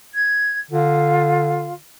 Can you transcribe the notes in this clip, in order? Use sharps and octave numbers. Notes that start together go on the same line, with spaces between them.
G#6
D3 F4